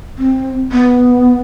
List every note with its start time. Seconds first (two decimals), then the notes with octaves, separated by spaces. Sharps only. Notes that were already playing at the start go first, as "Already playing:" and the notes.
0.18 C4
0.72 B3